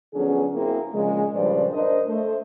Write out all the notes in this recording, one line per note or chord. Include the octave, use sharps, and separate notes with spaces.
D3 F3 F#3 B3 C#4 G#4
F#2 A#3 C4 E4 G#4
A#2 C#3 F3 G#3
G2 A#2 C#3 F3 C5 D5
D4 A#4 C5 D#5
A3 C5